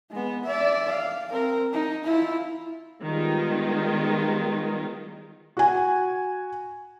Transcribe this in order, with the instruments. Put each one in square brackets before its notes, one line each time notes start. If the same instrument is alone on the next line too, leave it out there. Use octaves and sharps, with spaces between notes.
[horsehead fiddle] G#3 B3
D5 E5
F5
C4 A#4
D#4
E4 F4
[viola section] D#3 G3 G#3 B3 F4
[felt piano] F#4 G#5